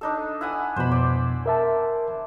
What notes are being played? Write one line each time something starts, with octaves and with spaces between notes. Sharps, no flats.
D4 D#4 A4
E4 F#5 G#5
F2 B2 C5 B5
D5
A#4 E5 A5